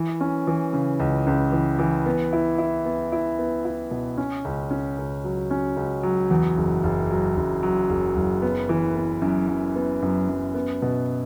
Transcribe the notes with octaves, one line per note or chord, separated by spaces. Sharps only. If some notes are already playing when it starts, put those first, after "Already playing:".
Already playing: E3
C#4
E3
C#3
C#2
C#2
E3
E3
B3
E4
E4
B3
E4
B3
E4
B2
C#4
C#2
C#4
C#2
F#3
C#4
C#2
F#3
E2
F#1
F#1
F#3
F#1
F#3
F#1
F#1
B3
E3
B3
F#2
F#2
B3
F#2
F#2
B3
B2